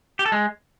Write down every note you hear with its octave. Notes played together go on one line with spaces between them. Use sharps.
G4
A4
G#3